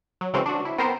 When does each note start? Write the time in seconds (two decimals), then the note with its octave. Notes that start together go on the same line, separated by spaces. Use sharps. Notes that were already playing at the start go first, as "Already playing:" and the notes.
0.21 F#3
0.33 C#3 E3 F#3 G#3 C4 C#4
0.46 D4 F#4
0.65 E4
0.78 B3 C4 A#4 C5